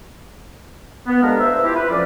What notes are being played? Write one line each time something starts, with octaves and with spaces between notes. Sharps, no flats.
B3
D3 G#3 D4 G4 A#4 F5
G2 B4 C5 E5
E4 F4 G4
B4
F2 F3 C#4 D5